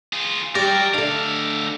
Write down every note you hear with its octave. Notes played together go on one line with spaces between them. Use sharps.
F4 G#4
F#3 G3 G4 A#4 D5
D2 D3 D4 F5